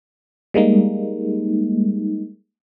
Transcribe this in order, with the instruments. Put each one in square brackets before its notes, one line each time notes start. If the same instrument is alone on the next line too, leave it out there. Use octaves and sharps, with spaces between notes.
[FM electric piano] G3 G#3 A#3 D#4